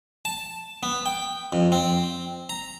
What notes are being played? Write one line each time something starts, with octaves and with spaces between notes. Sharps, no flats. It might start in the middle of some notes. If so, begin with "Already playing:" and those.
A5
B3
G5
F2
C4
A#5